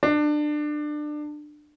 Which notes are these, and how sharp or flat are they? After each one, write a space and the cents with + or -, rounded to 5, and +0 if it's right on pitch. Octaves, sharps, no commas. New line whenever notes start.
D4 +25